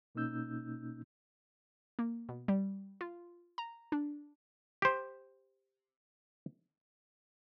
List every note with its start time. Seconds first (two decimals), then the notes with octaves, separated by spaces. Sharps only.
0.15 B2 A#3 C#4 D#4 E6 G6
1.99 A#3
2.29 B2
2.48 G3
3.01 F4
3.58 A#5
3.92 D4
4.82 G4 C5